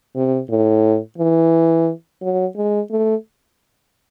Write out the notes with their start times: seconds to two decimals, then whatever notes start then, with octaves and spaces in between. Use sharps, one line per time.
0.15 C3
0.49 A2
1.18 E3
2.22 F#3
2.56 G#3
2.91 A3